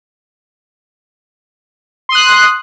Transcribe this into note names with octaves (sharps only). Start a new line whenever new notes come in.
C6 D#6 F#6